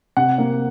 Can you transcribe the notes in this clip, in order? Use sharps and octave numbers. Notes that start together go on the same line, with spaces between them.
C3 F#5
A#3